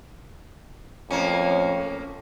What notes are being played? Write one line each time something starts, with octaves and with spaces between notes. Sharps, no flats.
F2 A2 A#3 C#4